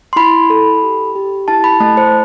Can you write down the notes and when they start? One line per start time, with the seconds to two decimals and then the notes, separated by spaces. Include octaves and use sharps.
0.13 C6
0.16 E4 B5
0.50 A4
0.83 G4
1.16 G4
1.48 E4 A5
1.64 B5
1.80 A3 A5
1.97 C5